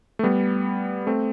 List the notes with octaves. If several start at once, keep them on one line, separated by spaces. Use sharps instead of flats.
A3
G3 B3
A3 C4